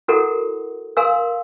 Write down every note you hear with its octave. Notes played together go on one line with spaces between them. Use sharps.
E4 F#4 A4 A#4 F#5
A#4 F5 G#5 C6 E6